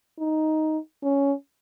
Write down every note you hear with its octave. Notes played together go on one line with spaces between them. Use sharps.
D#4
C#4